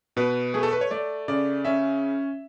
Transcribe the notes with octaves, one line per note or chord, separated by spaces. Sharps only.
B2 B4
A3 G#4
A4
B4
C#5
A3 D5
C#3 D5
C#4 E5